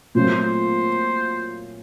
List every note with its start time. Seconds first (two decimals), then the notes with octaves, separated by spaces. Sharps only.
0.15 A#2 F#3 A3 C4 F4 C5
0.41 C5